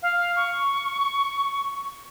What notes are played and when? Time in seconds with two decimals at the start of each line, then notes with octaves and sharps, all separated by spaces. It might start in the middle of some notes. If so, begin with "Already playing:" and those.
0.02 F5
0.36 C#6